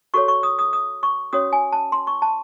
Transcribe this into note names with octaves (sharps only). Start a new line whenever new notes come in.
F#4 A4 C#5 C#6
C#6
D#6
D#6
D#6
C#6
C#4 F#4 C#5 D#6
G#5
A5
C6
C#6
A5